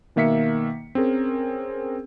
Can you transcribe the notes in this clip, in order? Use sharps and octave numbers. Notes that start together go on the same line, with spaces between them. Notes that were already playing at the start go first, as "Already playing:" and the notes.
B2 D#3 A#3 E5 B6 C#7
C4 C#4 G#4 A#4